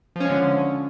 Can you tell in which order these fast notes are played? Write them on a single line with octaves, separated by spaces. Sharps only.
F3 C#4 G#3 D3